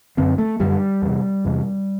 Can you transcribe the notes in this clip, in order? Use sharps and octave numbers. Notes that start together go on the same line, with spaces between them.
F#2 D3 C4
A3
F#2 D3 G3
E2 C3
E2 C3